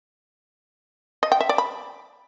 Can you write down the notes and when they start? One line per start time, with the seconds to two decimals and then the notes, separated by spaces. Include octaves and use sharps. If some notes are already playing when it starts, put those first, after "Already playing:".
1.23 D#5
1.32 G5
1.41 E5
1.49 D5
1.58 B5